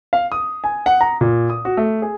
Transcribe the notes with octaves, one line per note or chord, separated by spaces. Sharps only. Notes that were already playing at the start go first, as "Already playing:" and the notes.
F5
D#6
G#5
F#5
A#5
A#2
D#6
F#4
A3
G#4